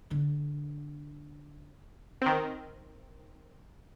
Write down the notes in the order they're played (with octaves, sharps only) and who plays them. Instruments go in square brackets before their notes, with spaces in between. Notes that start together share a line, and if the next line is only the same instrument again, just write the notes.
[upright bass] D3 D4
[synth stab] D#3 C4